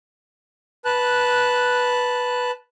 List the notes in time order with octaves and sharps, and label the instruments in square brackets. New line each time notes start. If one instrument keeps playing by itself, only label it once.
[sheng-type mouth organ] B4 A5 F#6